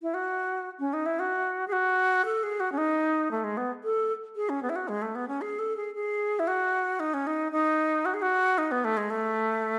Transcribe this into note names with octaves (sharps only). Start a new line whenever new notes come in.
E4
F#4
C#4
D#4
E4
F#4
G#4
F#4
A4
G#4
F#4
C#4
D#4
A3
G#3
B3
A4
G#4
C#4
B3
E4
F#4
G#3
A3
B3
C#4
G#4
A4
G#4
G#4
E4
F#4
D#4
C#4
D#4
D#4
F#4
G#4
F#4
D#4
B3
A3
G#3
A3